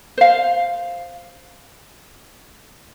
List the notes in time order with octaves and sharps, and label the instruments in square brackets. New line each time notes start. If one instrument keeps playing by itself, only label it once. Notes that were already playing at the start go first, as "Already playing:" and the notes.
[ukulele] C5 F5